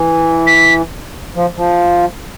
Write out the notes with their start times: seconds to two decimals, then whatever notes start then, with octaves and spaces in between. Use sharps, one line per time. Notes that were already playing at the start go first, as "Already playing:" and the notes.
Already playing: E3
0.47 B6
1.36 F3
1.57 F3